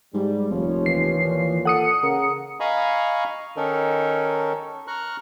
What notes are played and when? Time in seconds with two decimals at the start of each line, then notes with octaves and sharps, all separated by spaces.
0.14 G#2 G3
0.50 F1 D#2 F3 C#5
0.86 E3 C7
1.25 A#2
1.65 A4 F#5 D#6 C#7
2.03 C#3 A#4
2.60 D#5 F5 G#5 A#5 B5 C#6
3.57 D#3 C#4 D#4 A4 A#4
4.88 A#5 C#6 F6 F#6